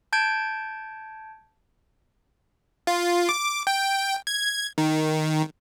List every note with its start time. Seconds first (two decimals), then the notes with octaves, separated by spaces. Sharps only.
0.13 A5 G6 G#6 D7
2.87 F4
3.29 D6
3.67 G5
4.27 G#6
4.78 D#3